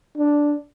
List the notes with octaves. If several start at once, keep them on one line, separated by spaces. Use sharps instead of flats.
D4